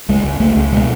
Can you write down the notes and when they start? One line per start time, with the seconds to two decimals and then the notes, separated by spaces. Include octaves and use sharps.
0.09 C#2 G#3
0.24 C#2
0.40 C#2 A3
0.56 C#2
0.72 B2 G#3